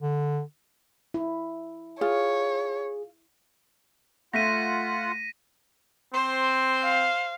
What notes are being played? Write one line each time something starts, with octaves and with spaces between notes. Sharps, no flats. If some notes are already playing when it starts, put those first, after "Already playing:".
D3
E4
F4 G#4 C#5
A3 F4 F#5 A#6 B6 D#7
C4 C5 C6
F5